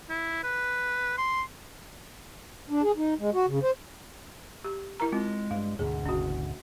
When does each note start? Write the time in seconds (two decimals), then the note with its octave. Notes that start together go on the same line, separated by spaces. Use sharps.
0.10 E4
0.44 B4
1.18 C6
2.70 D4
2.83 G#4
2.97 D#4
3.19 G#3
3.34 F#4
3.47 C#3
3.63 C5
4.64 G4
5.00 E4 A#4 A#5
5.12 G#3 C4 F4
5.51 G2 F5
5.79 D2 G#2 B2 G#4
6.06 F#1 C#4 F#4